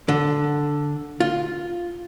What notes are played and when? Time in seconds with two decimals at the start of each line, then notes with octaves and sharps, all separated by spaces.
0.09 D3
1.20 F4